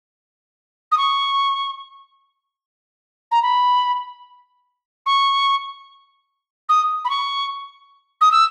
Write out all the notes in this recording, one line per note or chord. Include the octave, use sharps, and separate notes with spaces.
D#6
C#6
A#5
B5
C#6
D#6
B5
C#6
D#6
E6